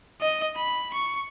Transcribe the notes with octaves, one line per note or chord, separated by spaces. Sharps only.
D#5
B5
C#6